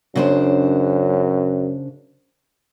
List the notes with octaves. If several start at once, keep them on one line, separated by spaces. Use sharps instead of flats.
F#2 C#3 D4 C5